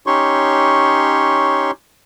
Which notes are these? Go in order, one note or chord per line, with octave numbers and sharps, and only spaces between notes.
C#4 D#4 G4 C#5 C6 C#6